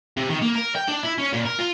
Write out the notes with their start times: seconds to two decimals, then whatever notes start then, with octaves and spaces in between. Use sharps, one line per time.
0.17 C3
0.29 D#3
0.42 A#3
0.55 A#4
0.75 G5
0.88 D4
1.03 E4
1.18 C#4
1.33 A#2
1.45 A#4
1.59 F4